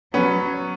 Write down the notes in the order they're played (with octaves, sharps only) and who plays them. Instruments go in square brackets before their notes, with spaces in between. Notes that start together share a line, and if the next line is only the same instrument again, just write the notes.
[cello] F#3 [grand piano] B3 C#4